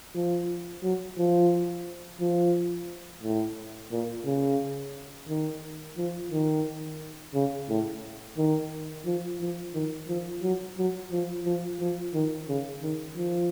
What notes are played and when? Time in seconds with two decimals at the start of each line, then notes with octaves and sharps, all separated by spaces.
0.15 F3
0.83 F#3
1.18 F3
2.20 F3
3.23 A2
3.91 A#2
4.26 C#3
5.29 D#3
5.97 F3
6.31 D#3
7.34 C#3
7.69 A2
8.37 D#3
9.06 F3
9.40 F3
9.75 D#3
10.08 F3
10.42 F#3
10.77 F#3
11.11 F3
11.45 F3
11.80 F3
12.14 D#3
12.48 C#3
12.83 D#3
13.17 F3